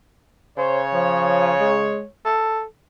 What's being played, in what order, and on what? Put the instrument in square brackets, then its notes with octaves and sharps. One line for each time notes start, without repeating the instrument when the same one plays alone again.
[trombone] C#3 [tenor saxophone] C5 [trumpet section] C#5
[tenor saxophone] F3
G#3
A4